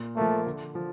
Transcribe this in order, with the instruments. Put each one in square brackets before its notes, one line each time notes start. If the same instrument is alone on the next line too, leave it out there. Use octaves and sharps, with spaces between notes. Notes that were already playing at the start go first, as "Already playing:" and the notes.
Already playing: [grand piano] A#2
[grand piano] F3 A#3 [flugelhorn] A3
[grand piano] D3
F3